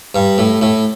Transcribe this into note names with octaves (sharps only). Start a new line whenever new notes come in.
G2
A2
A2